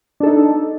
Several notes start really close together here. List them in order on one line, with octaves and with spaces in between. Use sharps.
D4 A4 D#4